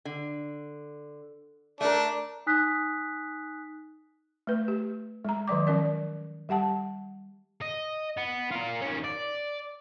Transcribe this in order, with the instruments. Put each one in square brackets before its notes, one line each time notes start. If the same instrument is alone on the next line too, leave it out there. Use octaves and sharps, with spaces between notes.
[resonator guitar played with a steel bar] D3
[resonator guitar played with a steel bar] A3 A#4 [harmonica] D4
[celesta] D#4 G#5 D#6 F#6 B6
[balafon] A3 B4
G4
G#3 A#5
D#3 F#3 D5 D6
F3 C#4 A#4 D5
G3 G4 F#5 A5
[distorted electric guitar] D#5
B3
F4 A#4
D#3 C#4
D5